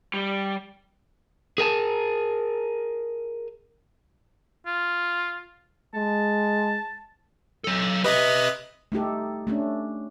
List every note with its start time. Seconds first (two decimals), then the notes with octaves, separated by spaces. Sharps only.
0.14 G3
1.58 G#4 A#4 G#5 A5
4.67 F4
5.94 G#3 A5
7.64 F#3 A4
8.04 G4 B4 D#5 E5 B5
8.92 A3 D#4 G4 A4
9.47 A3 C#4 D4